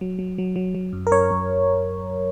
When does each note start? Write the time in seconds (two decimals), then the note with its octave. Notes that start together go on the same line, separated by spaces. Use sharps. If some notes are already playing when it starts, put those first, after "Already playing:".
0.01 F#3
0.19 F#3
0.38 F#3
0.56 F#3
0.75 F#3
0.93 F#2
1.07 A#4
1.11 F#2 C#5
1.31 F#2